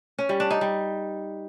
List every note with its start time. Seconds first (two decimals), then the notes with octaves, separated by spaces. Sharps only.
0.19 C#4
0.29 G3
0.40 D4
0.51 D#4
0.61 G3